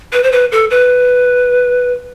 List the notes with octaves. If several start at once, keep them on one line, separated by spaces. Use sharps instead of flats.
B4
C5
B4
A4
B4